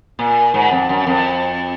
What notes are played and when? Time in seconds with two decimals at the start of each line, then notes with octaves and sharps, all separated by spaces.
0.19 A#2
0.54 G#2
0.71 F2
0.89 F#2
1.07 F2